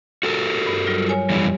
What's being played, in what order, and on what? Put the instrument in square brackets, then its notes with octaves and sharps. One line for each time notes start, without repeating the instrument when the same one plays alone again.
[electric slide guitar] F#4 A4 A#4
[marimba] G2
F#3 G3 F4
C#5 G#5
[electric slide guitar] F2 E3 G3 [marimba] G4